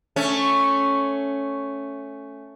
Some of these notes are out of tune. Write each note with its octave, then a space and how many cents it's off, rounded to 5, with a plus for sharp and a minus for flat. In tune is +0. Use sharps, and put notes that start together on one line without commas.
A3 +0 C#4 +0